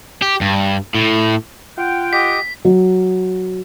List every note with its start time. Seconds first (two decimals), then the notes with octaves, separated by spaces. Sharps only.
0.22 G4
0.41 G2
0.95 A2
1.78 F4 F#5 G5
2.13 G4 D#5 B6
2.65 F#3